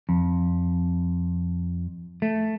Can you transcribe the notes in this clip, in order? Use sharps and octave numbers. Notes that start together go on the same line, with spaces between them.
F2
A3